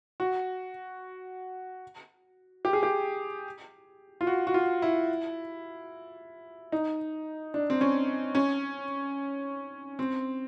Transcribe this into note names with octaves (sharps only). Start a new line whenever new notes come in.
F#4
G4
G#4
G4
F4
F#4
F#4
F4
E4
D#4
D4
C4
C#4
C#4
C4